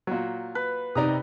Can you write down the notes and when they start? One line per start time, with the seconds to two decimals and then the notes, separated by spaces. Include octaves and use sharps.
0.07 A#2 F#3
0.55 B4
0.95 C3 D#4 D5 A#5 D#6